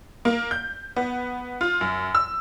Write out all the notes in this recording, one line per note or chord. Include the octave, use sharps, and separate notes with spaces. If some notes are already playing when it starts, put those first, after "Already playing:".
A#3
G6
B3
F4
F#2
E6